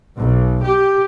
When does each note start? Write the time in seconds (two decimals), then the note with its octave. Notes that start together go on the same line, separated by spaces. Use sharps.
0.18 B1
0.64 G4